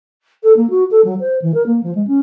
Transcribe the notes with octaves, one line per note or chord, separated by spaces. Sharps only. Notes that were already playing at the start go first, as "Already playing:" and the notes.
A4
A#3
F#4
A4
F#3
C5
E3
A#4
A#3
F3
G#3
C#4